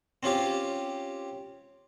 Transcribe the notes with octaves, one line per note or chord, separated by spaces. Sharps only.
C4 C#4 F4 G4